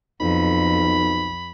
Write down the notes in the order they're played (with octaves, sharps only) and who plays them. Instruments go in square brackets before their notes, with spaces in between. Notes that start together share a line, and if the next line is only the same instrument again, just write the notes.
[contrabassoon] B1 [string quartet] F2 [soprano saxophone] B5